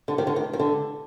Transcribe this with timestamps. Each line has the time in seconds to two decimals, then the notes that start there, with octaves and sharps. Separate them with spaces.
0.08 D3
0.18 D#3
0.27 D3
0.36 D#3
0.53 D#3
0.59 D3